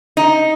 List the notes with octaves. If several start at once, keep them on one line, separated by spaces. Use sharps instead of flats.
D#4